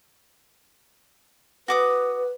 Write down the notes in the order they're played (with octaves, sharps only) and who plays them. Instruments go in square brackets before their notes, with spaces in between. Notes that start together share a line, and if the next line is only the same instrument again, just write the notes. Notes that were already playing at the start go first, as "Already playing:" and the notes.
[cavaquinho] F#4 D6 D#6 [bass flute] B4